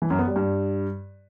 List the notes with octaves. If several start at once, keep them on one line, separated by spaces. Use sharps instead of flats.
E3
F#2
B3
G3
G2